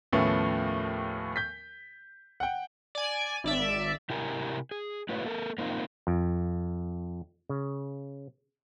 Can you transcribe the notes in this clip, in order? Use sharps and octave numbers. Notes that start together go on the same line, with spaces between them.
D#2 A2 F3 A3 B3 C#4
G6 B6
F#5 G5
D5 G#5
G#1 D5 E5
C3 E4 G4 A#4 G#5 A#5
G#4
A3 E4 F#4 B4 C#5 F5
A#3 A4 A#4
A#3 C4 D#4 F4
F2
C#3